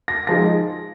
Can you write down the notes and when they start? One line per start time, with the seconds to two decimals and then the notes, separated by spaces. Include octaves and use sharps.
0.08 A#6
0.27 F3 G#3 D#4 A#6